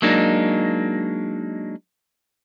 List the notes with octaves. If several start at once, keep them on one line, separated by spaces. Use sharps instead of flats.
F#3 G#3 A#3 D4 D#4